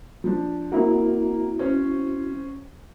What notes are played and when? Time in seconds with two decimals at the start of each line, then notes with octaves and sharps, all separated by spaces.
0.24 F3 D4
0.72 A#3 C4 E4 F#4
1.59 C#4 C5 C#5